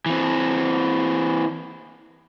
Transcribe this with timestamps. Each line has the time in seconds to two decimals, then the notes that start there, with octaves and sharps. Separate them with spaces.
0.06 E3 C4